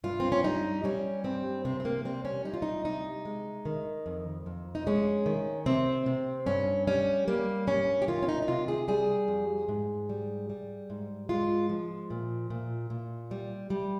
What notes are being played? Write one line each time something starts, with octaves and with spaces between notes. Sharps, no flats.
G2 F4
C4
C#4
G3 D#4
G3 C#4
G2 C4
C3 C4
C4
A#3
G3 C4
C#4
G3 D#4
F4
D#4
C3 D#4
G#3
D#3
F2
F2
D#4
G#3 C#4
D#3
C3 C4
C3
G2 C#4
G3 C#4
G3 A#3
G2 C#4
G4
D#3 F4
C#4
D#4
D#4
C3 F4
G#4
G3 G#4
F2
G#2
G3
G3
G#2
G#3 F4
F3
A#2
A#2
A#2
G3
G3